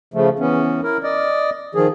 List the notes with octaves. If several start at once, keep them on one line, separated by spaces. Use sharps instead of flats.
C#3 F3 A3
E3 B3 C#4
E4 A#4
D5 D#5
D#3 F3 G#4